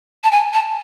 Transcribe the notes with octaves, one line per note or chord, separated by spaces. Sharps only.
A5
G#5
A5